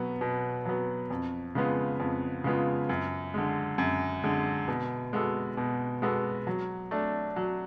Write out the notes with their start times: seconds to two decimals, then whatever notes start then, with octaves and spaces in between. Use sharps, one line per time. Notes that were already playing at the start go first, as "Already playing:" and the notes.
Already playing: B2 F#3 B3
0.21 B2
0.65 F#3 B3
1.10 F2
1.55 C#3 G#3 B3 F4
2.00 F2
2.44 C#3 G#3 B3 F4
2.89 F#2
3.34 D3 G#3
3.78 F#2
4.24 D3 G#3
4.68 B2
5.13 G#3 B3 F#4 A4
5.57 B2
6.02 G#3 B3 F#4 A4
6.47 F#3
6.91 A3 D4
7.36 F#3